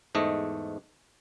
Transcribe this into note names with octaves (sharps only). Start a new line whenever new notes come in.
E2 G#2 A3 D#5